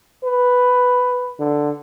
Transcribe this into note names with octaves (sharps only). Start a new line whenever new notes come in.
B4
D3